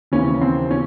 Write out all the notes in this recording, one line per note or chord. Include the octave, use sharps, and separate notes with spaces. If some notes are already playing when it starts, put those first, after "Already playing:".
D#2 C#3 E3 C#4
C4
C#4